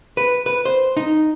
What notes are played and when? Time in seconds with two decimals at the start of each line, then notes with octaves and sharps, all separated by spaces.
0.17 B4
0.46 B4
0.65 C5
0.97 D#4